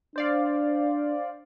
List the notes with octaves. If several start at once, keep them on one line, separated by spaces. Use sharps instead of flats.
D4 C5 D5 F5